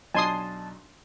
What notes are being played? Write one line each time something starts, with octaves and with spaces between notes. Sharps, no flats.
B1 D4 D#5 G#5 A5 C6 D#6